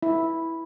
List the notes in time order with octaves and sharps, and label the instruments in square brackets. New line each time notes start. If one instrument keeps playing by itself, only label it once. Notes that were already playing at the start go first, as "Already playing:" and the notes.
[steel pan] E4